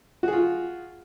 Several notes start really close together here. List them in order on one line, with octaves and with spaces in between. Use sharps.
F#4 G#4 F4